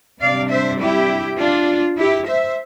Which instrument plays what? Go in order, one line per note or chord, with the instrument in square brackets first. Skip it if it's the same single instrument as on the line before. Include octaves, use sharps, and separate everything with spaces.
[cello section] C3 G3 D4 D5 F5
C5 E5
E4 G4
D4 F4
E4 G4
C5 E5